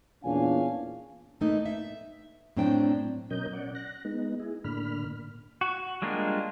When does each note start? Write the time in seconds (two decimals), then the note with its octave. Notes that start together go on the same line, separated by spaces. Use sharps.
0.23 E2 A#2 C#4 D4 F5 G#5
1.41 A2 E3 A3 A#3 D#4
1.66 E5
2.57 A2 F#3 C4 D4 C5 G5
3.30 B2 F#3 C#4 A#4 D#5 G6
3.53 C#4 D5 F#5
3.75 F#6 A#6
4.05 G#3 B3 D#4
4.40 E4 G#4
4.64 A2 D3 A#3 D4 B5 F6
5.61 F#4
6.02 G3 G#3 A#3 D4 F4